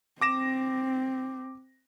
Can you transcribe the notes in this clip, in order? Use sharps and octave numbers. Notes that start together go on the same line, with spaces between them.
C4 D6 A#6 E7